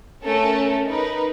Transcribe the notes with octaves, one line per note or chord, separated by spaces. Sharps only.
A3 C#4 A4 A#4
D#4 A#4 B4